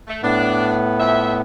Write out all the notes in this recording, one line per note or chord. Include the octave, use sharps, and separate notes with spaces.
A3
A2 B3 D4
F2 E5